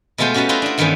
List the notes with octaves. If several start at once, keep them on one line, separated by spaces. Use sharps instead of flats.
B2 G#3 A3 B3 F4 C5
C#4 F#4 G4 B4 A5
E4 F4 B4 C5 D#5 F5
D4 F#4
G2 D#3 E3 A3 B3 C#4